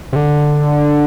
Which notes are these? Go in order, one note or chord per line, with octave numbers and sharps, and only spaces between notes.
C3
D3